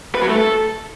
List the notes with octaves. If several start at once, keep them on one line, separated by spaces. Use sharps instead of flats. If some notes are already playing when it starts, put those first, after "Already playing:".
B4
F#3
A3
A4